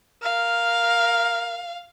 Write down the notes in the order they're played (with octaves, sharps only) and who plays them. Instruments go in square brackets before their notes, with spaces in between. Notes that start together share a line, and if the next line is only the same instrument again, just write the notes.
[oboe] A#4 [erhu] F5